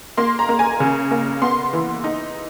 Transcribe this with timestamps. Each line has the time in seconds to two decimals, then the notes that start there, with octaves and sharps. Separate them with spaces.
0.17 A#3 C6
0.39 A#5
0.49 A#3
0.59 G#5
0.80 C#3
1.11 A#3
1.42 B3 C6
1.73 E3
2.04 D#4